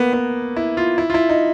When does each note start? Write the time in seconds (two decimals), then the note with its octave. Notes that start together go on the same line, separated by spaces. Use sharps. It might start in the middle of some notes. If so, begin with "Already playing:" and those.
Already playing: A#3 B3
0.13 B3
0.56 E4
0.77 F4
0.98 E4
1.10 F4
1.14 E4
1.29 D#4